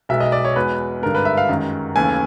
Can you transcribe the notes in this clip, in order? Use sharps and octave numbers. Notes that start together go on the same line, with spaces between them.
B1 B2 G#3 E5
D#5
D5
C#5
E2 B2 G#3 B4
G#1 G2 D3 A#4
B4
E5
F5
F#2 D#3 G#3
D#2 C#3 E3 A3 G#5